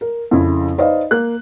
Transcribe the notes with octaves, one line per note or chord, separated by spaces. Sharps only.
A#4
F2 C#3 E4
D#4 B4 C5 D5 D#5 F5
A#3 F#6